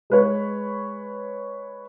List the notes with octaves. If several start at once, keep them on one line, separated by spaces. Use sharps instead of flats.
G#3 B4 C#5